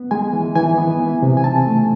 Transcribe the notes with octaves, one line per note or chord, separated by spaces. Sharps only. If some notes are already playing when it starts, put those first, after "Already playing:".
Already playing: B3
G#3 G#5
E3
E3 G#5
B3
E3
C3
G#5
C4 A5
A3